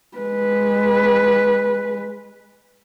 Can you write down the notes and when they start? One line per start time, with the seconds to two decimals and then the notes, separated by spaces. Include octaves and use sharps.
0.17 G#3 B4